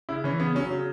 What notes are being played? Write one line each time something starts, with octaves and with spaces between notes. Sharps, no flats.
C#3 E4
E3 C#4
C#3 B3
F#3 C#4
C#3